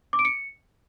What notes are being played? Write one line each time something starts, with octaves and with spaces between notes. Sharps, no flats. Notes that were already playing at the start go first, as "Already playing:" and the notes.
D6
D7
C#7